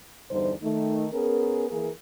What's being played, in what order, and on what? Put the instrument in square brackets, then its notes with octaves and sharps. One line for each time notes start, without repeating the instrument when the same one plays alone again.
[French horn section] E2 G2 D3 G3 D#4 C5
D#3 A3 D#4
B3 C#4 G#4 A#4
E3 A#3 G#4 A#4